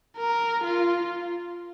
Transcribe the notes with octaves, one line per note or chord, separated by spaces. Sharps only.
A#4
F4